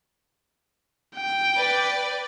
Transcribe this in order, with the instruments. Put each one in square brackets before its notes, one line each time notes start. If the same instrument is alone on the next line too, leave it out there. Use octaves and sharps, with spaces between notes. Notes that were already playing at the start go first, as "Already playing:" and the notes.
[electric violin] G5
[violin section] B4 D5